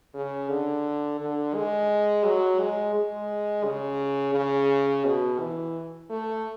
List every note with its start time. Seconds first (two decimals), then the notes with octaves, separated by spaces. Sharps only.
0.14 C#3
0.50 D3
1.20 D3
1.55 G#3
2.25 F#3
2.60 G#3
2.94 G#3
3.65 C#3
4.35 C#3
5.05 B2
5.40 E3
6.10 A3